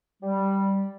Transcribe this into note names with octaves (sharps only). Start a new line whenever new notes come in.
G3